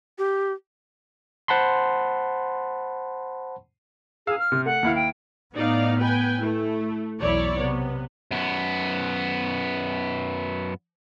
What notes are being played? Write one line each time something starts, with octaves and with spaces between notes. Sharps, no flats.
G4
C5 F#5 A5 B5 C6
G#4 F5 E6
F6
C3
A3 F#5
D#2 E4 F5
G5
A2 B3 D#4 D5 F5
B4 G5 G#5
A3 E4
B1 E2 E4 C#5 D5
C3 B3
F#2 B3